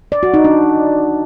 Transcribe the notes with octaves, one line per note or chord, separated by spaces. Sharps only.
D5
F#4
D#4
D4